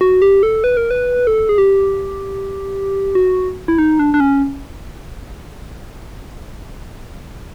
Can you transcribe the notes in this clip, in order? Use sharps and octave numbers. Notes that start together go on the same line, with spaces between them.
F#4
G4
A4
B4
A#4
B4
A4
G#4
G4
F#4
E4
D#4
D4
D4
C#4